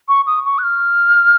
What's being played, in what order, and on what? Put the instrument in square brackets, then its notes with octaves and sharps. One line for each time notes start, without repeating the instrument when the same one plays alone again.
[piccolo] C#6
D#6
C#6
F#6
F6